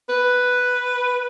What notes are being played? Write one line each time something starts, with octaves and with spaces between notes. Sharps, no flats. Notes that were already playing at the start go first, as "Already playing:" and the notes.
B4